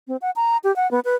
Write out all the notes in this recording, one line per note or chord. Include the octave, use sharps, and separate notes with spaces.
C4
F#5
A#5
G4
F#5
B3
B4